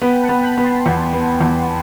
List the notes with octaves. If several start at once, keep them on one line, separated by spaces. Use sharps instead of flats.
B3 G5 B5
F#5 A5
B3
G5 B5
B3
A5 C6
E2
B3
E2